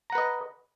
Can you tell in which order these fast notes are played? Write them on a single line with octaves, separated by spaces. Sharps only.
A#5 F#5 B4 D#5